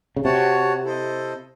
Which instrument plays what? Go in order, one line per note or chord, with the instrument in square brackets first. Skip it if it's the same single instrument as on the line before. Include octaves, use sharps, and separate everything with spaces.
[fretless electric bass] C#3
[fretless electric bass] C3 [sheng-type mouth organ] F#4 C#5 F#5 A5
[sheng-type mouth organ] E4 A4 C5 D#5